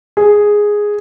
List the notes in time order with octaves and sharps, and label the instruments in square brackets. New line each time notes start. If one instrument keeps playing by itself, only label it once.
[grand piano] G#4